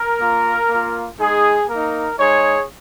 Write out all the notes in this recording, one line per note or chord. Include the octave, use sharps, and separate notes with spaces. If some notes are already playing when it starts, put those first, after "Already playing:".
Already playing: A#4
A#3 F4
A#3 F4
G#3 D#4 G#4
A#3 D#4 A#4
G#3 D#4 G#4 C#5